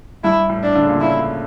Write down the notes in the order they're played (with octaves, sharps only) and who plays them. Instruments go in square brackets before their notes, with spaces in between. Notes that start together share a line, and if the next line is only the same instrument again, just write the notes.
[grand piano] G2 [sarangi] E4
[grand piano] A2
[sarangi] D4
[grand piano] D3
C#3
A#2
[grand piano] C#3 [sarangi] E4